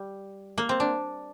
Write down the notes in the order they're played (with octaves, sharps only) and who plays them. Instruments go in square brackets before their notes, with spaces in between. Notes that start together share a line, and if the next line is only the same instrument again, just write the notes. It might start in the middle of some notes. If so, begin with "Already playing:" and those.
Already playing: [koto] G3
A#3
C4
D4